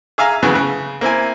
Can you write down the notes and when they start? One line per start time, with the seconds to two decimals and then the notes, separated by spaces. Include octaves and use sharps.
0.18 G#4 E5 F5 G#5 A#5
0.43 D2 C#3 E3 F#3 B3
0.55 C#3
1.01 A#3 C4 E4 G#5